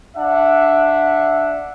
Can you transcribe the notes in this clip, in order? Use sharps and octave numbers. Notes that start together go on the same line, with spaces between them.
D4 E5 F#5